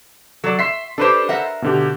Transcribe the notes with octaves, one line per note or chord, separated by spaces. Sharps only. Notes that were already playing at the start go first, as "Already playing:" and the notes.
F#3 A4 D5
E5 C6 B6 C7
D4 G4 A4 B4 C5
A#4 E5 F#5
B2 D3 G4